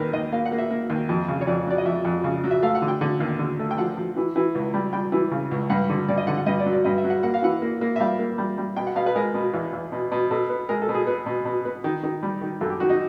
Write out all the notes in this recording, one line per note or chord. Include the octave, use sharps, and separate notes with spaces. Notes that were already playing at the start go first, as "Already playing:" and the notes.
Already playing: D#2 D#3 A#4 B4
D#2 D#5
A#3 F5
F#5
A#3
E5
A#3
D#2
F2
C#3
C#5
F2 D5
F#3 D5
D#5
F2 E5
F2
C#3
F#3
E5
A3 F5
F#5
D3
G5
D3 F#5
D#2
D3
A3
G5
F3 F#5
F3
E3
E3
C#2
G3
G3 G5
E3
C#3
C#2
G2 F#5
D3
G2 D5
D#5
D3 F#5
F#5
G2 D#5
D5
F#3
D5
G2 D#5
E5
F#3
F#5
A#3 F#5
F5
E3 F#5
A#3
A#3
E5
G3 F5
A#3
G3
G3
B2 G5
F#5
B2 F5
B4
G#3 A#4
B2
E2
E2
B2
B2
B2 A4
B3
G#3 A#4
A4
B2
G#4
B3
B2
B2
B3
D#3
D#3
G3
D#3
F#2 A4
G4
D#3 F#4
D#4